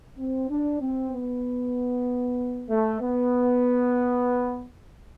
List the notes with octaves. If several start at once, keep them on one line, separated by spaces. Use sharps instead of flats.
C4
D4
C4
B3
A3
B3